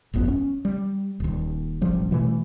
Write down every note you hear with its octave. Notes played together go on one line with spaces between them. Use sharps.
D1 G1 F2 B3
C#4
G3
D#1 D#2
E1 A1 F3 G3
B2 E3 F#3 A3